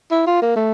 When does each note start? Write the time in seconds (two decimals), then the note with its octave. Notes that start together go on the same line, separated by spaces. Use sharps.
0.11 E4
0.27 F4
0.42 A#3
0.56 A3